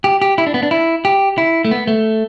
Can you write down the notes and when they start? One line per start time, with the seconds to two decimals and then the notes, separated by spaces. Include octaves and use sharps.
0.04 G4
0.22 G4
0.38 E4
0.47 D4
0.54 B3
0.63 D4
0.71 E4
1.05 G4
1.38 E4
1.65 A3
1.71 B3
1.87 A3